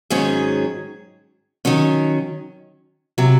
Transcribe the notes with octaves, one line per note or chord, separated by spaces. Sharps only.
G#2 D#3 F#3 C#4 G#4
D#3 F#3 C#4
C3 F#3